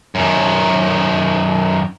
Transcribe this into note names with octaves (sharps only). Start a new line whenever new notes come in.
F#2 D#3